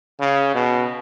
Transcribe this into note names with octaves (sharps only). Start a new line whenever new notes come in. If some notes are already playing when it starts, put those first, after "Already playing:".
C#3
B2